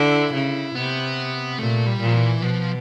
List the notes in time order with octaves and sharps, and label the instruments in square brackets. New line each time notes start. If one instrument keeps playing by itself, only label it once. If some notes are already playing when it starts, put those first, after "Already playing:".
Already playing: [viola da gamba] D3 [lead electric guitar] E4
[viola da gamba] C#3
[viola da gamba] C3 [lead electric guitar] B3
[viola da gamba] A#2 [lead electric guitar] A3
[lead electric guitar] G3
[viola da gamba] A#2
[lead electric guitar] F3
E3
[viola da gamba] B2 [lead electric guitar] F3